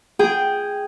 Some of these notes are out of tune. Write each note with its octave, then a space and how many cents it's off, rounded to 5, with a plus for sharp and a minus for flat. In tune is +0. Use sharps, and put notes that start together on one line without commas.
G#4 -10 G5 +0